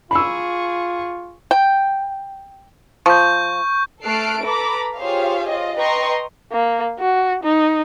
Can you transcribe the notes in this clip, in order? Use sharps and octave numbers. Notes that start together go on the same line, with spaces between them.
F4 G#4 B5 C#6 E6
G5
F3 C#6 G6
A3 A4 F6 F#6 C7 D7
A4 B4 A#5 B5 D6
F4 G4 G#4 C5 C#5 F5
F4 D#5
B4 D#5 G5 A#5 C6 C#6
A#3
F#4
D#4